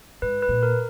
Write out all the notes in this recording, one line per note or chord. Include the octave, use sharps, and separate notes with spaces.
G#2 B4
B4
A#2
A#4